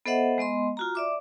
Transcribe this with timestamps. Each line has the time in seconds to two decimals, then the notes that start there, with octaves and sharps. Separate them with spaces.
0.06 B3 A4 C5 D#5 E5 F#5
0.38 G#3 B3 D#5 C6
0.77 F4 F#4 A#5
0.95 D5 E5 D6